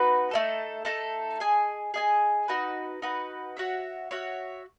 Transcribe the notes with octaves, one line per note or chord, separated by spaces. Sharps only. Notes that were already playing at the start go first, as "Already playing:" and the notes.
Already playing: B3 D#4 F#4 B4
A3 D#4 A4
A3 D#4 A4
G#4 D#5 G#5
G#4 D#5 G#5
D#4 F#4 B4
D#4 F#4 B4
F#4 C#5 E5
F#4 C#5 E5